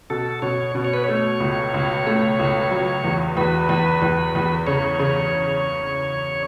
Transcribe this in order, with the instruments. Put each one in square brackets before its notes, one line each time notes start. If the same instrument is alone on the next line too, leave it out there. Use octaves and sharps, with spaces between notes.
[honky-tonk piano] B2 [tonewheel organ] A4
[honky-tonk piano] B2 [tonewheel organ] C#5
[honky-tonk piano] B2
[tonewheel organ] C#5
B4
[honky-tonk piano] A3 [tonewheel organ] C#5
[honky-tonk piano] C#2
C#2
A3
C#2
F#3
E2
[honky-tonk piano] E2 [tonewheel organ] B4
[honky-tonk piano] E2
E2
E2
[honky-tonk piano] C#3 [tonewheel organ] C#5
[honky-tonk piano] C#3